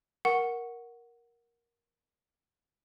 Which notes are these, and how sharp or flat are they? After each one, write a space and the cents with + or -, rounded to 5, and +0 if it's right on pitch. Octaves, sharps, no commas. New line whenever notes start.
A#4 +10 F#5 +0 C#6 +0